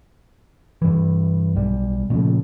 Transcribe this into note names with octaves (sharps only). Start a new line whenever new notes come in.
G2 E3
B1 G3
A#2 C#3 F3 A3